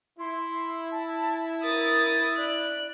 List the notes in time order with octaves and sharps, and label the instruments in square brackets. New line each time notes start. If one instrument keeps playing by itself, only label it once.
[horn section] E4 [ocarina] C6
[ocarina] A5
[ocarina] A#4 [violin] D#6 A6
[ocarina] D5 [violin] F#6